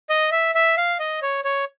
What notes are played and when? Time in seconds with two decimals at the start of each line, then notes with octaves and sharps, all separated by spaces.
0.10 D#5
0.31 E5
0.55 E5
0.77 F5
0.99 D#5
1.22 C#5
1.45 C#5